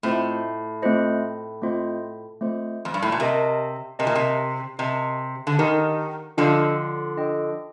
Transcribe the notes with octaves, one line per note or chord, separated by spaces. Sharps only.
A2 A3 C4 F4 C5 D#5
A3 C4 F4 C5 D#5
A3 C4 F4 C5 D#5
A3 C4 F4 C5 D#5
F2
G2
A2
A#2
C3 G4 A#4 D#5 A5
C3 G4 A#4 D#5 A5
A#2
C3
C3 G4 A#4 D#5 A5
D3
D#3 G4 A#4 D#5 A5
D3 F3 D4 F4 A4 D#5 G5
D4 F4 A4 D#5 G5